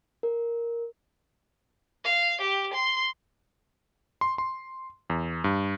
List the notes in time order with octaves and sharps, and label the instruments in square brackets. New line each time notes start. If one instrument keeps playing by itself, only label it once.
[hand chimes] A#4
[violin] F5
G4
C6
[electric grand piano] C6
C6
E2
G2